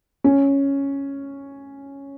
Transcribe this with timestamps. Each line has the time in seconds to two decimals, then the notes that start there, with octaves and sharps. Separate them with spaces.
0.24 C#4